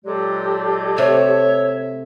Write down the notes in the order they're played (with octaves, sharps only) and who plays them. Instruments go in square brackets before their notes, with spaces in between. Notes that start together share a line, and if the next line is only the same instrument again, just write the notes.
[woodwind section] A#2 F#3 G#3 [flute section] G4 A4 D5
[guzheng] C3 A3 [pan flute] C#5 [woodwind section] E5